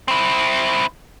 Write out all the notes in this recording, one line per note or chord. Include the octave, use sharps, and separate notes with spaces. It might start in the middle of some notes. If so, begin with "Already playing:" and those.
C4 E4